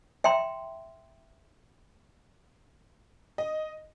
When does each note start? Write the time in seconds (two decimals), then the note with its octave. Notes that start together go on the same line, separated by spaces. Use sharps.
0.24 E5 G5 A#5 C6
3.38 D#5